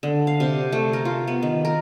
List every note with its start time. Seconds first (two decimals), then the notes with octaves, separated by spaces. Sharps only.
0.03 D3
0.27 F5
0.40 C3
0.72 A3
0.93 A#4
1.05 F4
1.28 B3
1.42 D#3
1.65 A#4